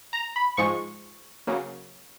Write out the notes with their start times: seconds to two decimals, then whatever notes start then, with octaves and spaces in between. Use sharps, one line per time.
0.13 A#5
0.36 B5
0.57 G#2 F3 G#3 C#6
1.47 C#3 F#3 A#3